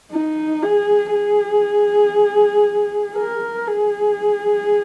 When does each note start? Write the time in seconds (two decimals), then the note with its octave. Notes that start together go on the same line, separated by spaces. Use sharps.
0.12 D#4
0.63 G#4
1.14 G#4
3.16 A#4
3.67 G#4